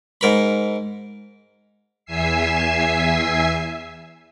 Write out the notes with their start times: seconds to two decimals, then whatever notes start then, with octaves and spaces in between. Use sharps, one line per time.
0.21 G#2 A#4 B5
2.05 E2 E5 G#5 E6 C7